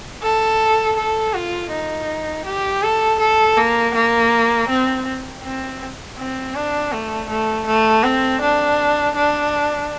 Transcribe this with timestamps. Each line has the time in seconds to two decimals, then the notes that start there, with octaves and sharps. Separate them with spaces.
0.22 A4
0.97 A4
1.34 F4
1.71 D#4
2.46 G4
2.83 A4
3.20 A4
3.57 A#3
3.95 A#3
4.69 C4
5.43 C4
6.18 C4
6.55 D4
6.92 A3
7.29 A3
7.67 A3
8.04 C4
8.42 D4
9.16 D4